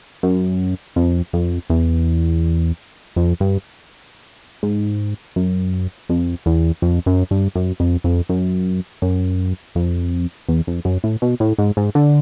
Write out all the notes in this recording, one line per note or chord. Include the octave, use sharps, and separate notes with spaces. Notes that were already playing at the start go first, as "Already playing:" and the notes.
F#2
F2
F2
E2
F2
G2
G#2
F#2
F2
E2
F2
F#2
G2
F#2
F2
F2
F#2
F#2
F2
E2
F2
F#2
A2
B2
A2
G#2
G#2
D3